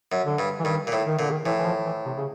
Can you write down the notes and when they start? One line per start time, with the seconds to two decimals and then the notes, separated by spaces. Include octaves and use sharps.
0.12 F#2
0.25 D3
0.39 G2
0.60 E3
0.65 G2 D#3
0.87 A#2
0.92 A2
1.05 D#3
1.18 A#2 D3
1.31 D#3
1.45 A2 E3
1.59 E3
1.66 F3
1.86 E3
2.06 C3
2.17 C#3